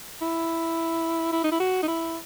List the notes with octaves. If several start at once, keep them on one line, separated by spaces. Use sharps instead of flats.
E4
E4
D#4
E4
F#4
D#4
E4